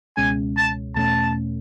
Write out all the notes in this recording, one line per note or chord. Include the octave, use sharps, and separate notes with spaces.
C#2 B2 G#3 C#4 G#5
A5
E2 B2 A3 C#4 A5